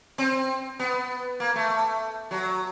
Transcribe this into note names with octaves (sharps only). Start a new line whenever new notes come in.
C4
B3
A#3
A3
F#3